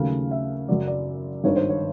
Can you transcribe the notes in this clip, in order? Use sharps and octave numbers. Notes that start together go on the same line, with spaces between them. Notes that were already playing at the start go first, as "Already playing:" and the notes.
Already playing: D#2 C#3 F#3 A3 F5
E5
F#2 C#3 F#3 D5
D5
G#1 G2 D#3 C#5
C5
C#5